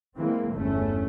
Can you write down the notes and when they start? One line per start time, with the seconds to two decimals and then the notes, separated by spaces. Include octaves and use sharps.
0.17 E3 G#3 A#3 C4
0.53 G1 E2 A3 C#4